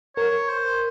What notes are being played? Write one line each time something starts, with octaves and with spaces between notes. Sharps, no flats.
A#4 C#5
C5